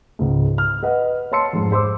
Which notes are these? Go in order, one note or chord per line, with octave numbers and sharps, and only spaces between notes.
C#2 G#2
F6
B4 D#5 F#5
C#5 D#5 A5 C6 E6 C#7
F2 G#2
C5 C6 D6 E6